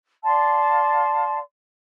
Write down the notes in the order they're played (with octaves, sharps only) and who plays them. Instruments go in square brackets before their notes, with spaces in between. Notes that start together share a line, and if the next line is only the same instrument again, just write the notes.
[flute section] D5 F5 A5 C6